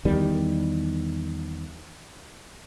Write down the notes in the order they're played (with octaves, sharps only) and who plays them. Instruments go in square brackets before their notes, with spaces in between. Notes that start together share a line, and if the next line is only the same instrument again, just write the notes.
[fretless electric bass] E2 D#3 G3